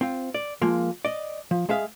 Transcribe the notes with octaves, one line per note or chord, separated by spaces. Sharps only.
C4 F4
D5
F3 G#3 A#3
D5 D#5
F3
G#3 G#4 E5 F5